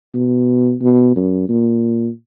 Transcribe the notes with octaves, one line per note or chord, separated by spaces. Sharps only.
B2
B2
F#2
A#2